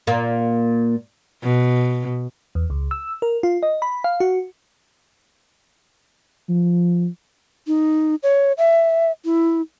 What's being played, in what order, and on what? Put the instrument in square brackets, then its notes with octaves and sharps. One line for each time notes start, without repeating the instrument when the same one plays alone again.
[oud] A#2 A#3
[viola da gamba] B2
[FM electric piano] E2
C#2
E6
A#4
F4
D#5
B5
F5
F#4
[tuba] F3
[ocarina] D#4
C#5
E5
E4